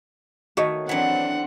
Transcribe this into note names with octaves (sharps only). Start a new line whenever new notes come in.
D#3 A3 F#4 C#5 D#5
E3 F#3 C4 D4 F#5